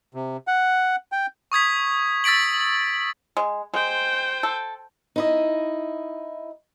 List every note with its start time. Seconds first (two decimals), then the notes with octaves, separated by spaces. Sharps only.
0.14 C3
0.47 F#5
1.12 G5
1.52 C#6 D#6 G#6 B6
2.24 E6 A6 B6 D7 F#7
3.37 G#3
3.74 G#3 C5 G5
4.43 A4
5.16 D#4 E4 D#5